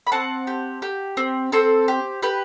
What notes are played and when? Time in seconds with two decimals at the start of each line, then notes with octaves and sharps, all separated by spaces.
0.07 B5
0.12 C4 F#5 A5
0.47 G4
0.82 G4
1.17 C4
1.52 C4 A4 C5
1.88 G4
2.22 G4 B4